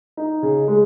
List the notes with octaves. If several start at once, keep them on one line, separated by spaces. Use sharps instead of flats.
D#4
C#3
G#3